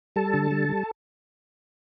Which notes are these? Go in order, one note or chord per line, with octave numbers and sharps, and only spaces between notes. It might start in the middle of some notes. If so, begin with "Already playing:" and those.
G3 A4 A5
D3
G3
G3